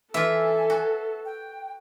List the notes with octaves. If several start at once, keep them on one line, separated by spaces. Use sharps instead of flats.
E3 F4 A4 E5 G#5
F#4
G5